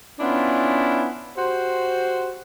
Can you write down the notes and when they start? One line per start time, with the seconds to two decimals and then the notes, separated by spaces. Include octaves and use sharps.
0.20 B3 C#4 D4 E4 F4
1.38 F#4 G4 C5